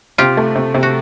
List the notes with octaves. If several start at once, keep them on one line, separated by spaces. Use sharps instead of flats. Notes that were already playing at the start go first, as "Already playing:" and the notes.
C3 F4 G4
A3
C3
C3
F#4